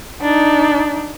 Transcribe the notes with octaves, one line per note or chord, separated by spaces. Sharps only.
D4 D#4